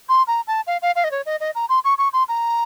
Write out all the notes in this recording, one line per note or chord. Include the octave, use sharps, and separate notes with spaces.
C6
A#5
A5
F5
F5
F5
D#5
C#5
D#5
D#5
A#5
C6
C#6
C#6
C6
A#5